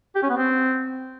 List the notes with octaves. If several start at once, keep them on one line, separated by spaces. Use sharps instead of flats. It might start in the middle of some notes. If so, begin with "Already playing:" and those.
G4
C#4
B3
C4